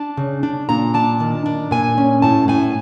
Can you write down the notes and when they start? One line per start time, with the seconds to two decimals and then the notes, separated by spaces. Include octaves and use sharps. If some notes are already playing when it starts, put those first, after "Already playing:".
Already playing: D4 A5
0.17 C#3
0.43 D4
0.69 A#2 A#5
0.94 D4 A5
1.20 D#3
1.46 D4
1.71 A#2 G#5
1.98 C#4
2.22 A2 A5
2.48 A2 G#5